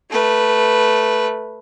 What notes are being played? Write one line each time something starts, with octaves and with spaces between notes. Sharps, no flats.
A3 B4